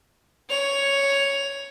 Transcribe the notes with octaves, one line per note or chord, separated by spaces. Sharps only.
C#5 F7